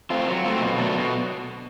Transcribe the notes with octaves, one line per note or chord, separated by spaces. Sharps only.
A3 C4 F4
F#3
A3 C4 F4
B2
F#3 A3 D4
B2